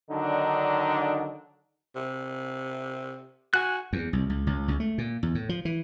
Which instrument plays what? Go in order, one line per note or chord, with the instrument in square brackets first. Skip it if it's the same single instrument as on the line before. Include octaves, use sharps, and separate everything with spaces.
[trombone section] D3 D#3 F#3 D4 D#4
[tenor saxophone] C3
[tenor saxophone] F#4 [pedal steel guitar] G#5 F#6
[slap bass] E2
C2
C#2
C#2
C#2
A3
A#2
E2
A2
F3
E3